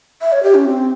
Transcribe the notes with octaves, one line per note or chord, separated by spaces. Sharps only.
E5
C#5
G4
C#4
C4